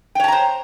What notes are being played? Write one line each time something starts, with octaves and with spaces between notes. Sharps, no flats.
C5 C#5 G5 A5 A#5